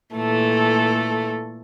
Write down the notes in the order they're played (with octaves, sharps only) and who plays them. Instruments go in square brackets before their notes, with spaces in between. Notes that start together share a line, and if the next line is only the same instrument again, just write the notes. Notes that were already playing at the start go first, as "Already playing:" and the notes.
[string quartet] A#2 E3 A3 A4